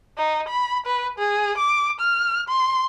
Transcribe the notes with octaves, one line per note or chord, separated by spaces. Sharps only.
D#4
B5
B4
G#4
D6
F6
C6